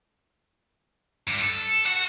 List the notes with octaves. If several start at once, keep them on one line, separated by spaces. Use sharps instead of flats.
G2
A4
F#4 F#5